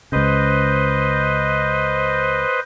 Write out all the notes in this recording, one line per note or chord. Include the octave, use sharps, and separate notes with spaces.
C#2 C#3 B4 C5 D#5